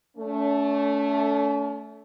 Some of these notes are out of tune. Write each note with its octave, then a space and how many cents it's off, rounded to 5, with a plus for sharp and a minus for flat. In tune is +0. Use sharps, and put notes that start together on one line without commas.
A3 +0 C#4 +40